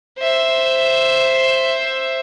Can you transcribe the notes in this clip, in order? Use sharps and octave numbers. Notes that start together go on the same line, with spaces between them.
C5 E5